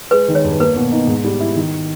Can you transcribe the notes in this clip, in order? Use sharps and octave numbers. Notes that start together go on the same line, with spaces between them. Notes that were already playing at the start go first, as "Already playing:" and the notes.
G#3 B4
D#3
C#5
G2
A#3 B4
B2
D#4
G#2
G3
E4
D#3